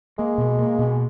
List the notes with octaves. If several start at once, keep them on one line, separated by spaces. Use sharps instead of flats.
G#3 A#3
B2
A#3
B2